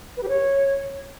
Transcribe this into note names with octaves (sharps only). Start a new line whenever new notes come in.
B4
G4
C#5